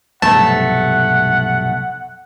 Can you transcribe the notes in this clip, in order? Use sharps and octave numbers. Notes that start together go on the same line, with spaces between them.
F1 B1 G2 A3 F#5 A5